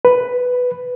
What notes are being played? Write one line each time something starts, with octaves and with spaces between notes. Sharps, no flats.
B4